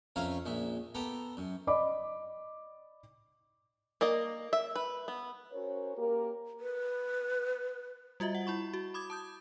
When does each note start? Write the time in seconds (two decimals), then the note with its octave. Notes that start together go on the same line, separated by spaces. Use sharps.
0.16 F2 C#4 B4 E5 F5 A#5
0.46 A#1 G#3 E5
0.95 B3 G4 A4 A#5
1.37 F#2
1.67 D5 D#5 B5 D6
4.01 A#3 D5 D#5
4.53 E5
4.76 B4
5.08 B3
5.53 C#4 F#4 A#4 C5 C#5
5.98 A#3 G4 A#4
6.60 B4
8.20 G3 F4 F#4 D#5 E5
8.35 F#5
8.47 E4 B5 C#6
8.74 F#4
8.94 B5 D6 D#6 G#6
9.10 A5 D#6 G6